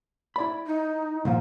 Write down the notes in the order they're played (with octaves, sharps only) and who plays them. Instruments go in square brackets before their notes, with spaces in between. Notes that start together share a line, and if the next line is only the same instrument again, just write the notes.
[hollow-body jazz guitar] E4 D5 B5
[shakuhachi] D#4
[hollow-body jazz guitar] C2 A#2 F3